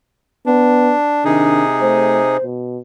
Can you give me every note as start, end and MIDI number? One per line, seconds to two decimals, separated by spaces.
0.46 0.94 59
0.46 1.24 62
1.25 2.37 48
1.25 1.63 51
1.25 1.62 62
1.25 2.37 63
1.25 2.37 68
1.81 2.21 57
1.81 2.44 72
2.43 2.78 47